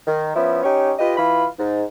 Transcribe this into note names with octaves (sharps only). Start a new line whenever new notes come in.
D#3
F3 B3 C#4 E4
C#4 D#4 G4 C#5
F4 G4 B4 D#5
E3 F4 B5
G#2